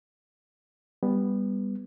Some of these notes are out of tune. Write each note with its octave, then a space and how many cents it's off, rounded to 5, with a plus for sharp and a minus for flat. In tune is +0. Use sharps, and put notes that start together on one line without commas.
G3 +20 B3 +0